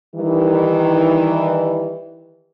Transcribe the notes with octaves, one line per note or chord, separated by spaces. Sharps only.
D#3 E3 G3